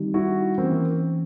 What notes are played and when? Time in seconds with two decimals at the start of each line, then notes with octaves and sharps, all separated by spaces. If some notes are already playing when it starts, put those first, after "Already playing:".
Already playing: D#3 G3 C4 D#4 G4
0.14 E4 F#4
0.58 E3 A3 A#3 C4 C#4